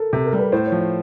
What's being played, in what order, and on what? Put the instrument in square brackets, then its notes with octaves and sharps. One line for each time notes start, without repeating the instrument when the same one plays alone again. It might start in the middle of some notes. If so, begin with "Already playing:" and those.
Already playing: [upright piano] A4 A#4
[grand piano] C3 [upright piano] A4
[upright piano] A#4
[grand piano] G3
[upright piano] B4
[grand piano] A2 [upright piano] C5
[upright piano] C#5
[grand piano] F3
[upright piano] C#5